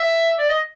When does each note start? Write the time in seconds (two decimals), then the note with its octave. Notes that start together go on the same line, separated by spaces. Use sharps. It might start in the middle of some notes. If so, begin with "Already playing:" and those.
Already playing: E5
0.39 D5
0.49 D#5